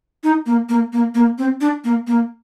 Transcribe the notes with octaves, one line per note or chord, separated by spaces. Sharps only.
D#4
A#3
A#3
A#3
A#3
C4
D4
A#3
A#3